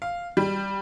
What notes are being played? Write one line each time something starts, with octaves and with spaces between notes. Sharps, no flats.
F5
G3